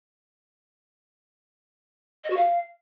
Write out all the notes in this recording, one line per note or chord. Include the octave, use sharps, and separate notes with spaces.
D#5
F#4
F5